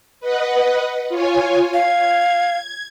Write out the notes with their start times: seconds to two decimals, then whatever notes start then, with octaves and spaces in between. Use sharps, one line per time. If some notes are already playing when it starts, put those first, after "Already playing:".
0.20 B4 D#5 F#5
1.09 F4 C#5 G#5
1.74 F5 G#6